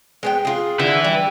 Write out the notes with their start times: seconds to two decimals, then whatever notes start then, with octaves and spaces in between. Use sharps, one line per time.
0.23 G#3 B3 G5
0.45 F4 G#4
0.80 D3 B4 E5
1.04 G3